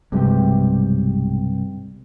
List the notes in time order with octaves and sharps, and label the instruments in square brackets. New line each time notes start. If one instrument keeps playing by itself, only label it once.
[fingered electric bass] B1 F#3 G#3 [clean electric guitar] G2 C3 G4